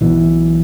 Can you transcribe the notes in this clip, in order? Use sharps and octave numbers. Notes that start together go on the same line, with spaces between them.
B1 B2 E3